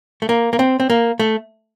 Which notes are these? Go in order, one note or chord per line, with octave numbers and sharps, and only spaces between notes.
A3
A#3
A#3
C4
C4
A#3
A3